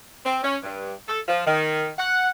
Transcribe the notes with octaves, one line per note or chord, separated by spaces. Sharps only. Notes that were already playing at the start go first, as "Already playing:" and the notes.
C4
C#4
G2
A4
F3
D#3
F#5